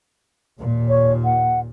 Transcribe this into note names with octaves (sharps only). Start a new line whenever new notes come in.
D#2 A#2
C#5
F#5